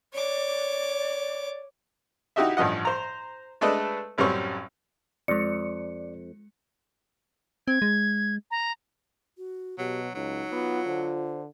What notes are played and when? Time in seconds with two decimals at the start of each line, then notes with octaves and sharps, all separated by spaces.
0.14 C#5 D5 D6
2.36 D#4 E4 F#4 G4 D#5 E5
2.57 A1 G2 F3 D#5 F#5
2.85 C5 A#5
3.61 G#3 A3 D4 A4 B4 D#5
4.18 A1 F#2 G3 C4 C#4 C#6
5.28 F2 G#3 D5 C#7
7.68 C4 G#6
7.82 G#3
8.51 A#5
9.38 F#4
9.78 B2 F#3 G4
10.15 C#2 F#3 D#4
10.52 B3 F4
10.86 D3 C5